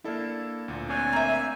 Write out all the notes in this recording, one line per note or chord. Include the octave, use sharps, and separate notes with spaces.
A#3 D4 E4 A4
D2 A#2
C4 D4 C#5 G#5
A#3 E5